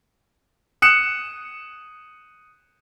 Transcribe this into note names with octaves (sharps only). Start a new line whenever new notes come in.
D#6 F#6 C#7 E7